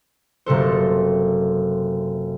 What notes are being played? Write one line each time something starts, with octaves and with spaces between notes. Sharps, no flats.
F#1 C3 A4 C5